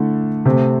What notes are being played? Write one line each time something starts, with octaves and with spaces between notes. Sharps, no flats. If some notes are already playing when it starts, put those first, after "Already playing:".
Already playing: D3 A3 E4
C3 A3 C4